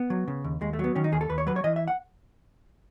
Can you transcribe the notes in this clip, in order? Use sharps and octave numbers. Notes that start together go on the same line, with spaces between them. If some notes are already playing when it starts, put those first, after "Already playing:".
Already playing: B3
F#3
C#3
D#2
D#2 G#3
A3
F#3 B3
D#3 C#4
D#4
D#2 G#4
A4
D#2 B4
C#5
F#3 B4
C#5
E3 D#5
E5
F#5